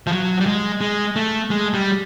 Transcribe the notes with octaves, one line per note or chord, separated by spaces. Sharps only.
F3
F#3
G3
G#3
G#3
A3
G#3
G3